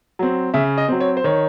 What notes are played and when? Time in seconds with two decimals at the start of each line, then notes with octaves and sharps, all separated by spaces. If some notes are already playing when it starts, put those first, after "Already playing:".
0.19 F#3 C4
0.54 C#3 E5
0.78 D#5
0.88 F#3 C4
1.00 C#5
1.17 C5
1.24 D#3 C#5